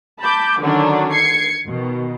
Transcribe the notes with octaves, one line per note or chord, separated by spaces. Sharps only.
A5 B5 D6 G6
D3 D#3 F#3 C#4 D4
G#6 C7 C#7
B2 D#3